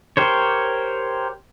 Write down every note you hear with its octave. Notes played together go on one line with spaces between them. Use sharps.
G4 A#4 C5 C#5